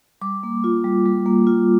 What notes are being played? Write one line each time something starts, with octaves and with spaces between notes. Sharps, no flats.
G3 D6
A#3
F4
G3
G3
A#3
F4